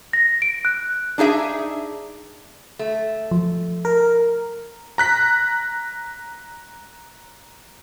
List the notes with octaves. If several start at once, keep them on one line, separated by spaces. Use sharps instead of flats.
A#6
D7
F#6
D4 D#4 G#4 E5
A3
F3
A#4
A#5 F#6 B6